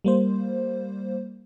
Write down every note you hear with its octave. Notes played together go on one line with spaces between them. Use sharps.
G3 A#3 C5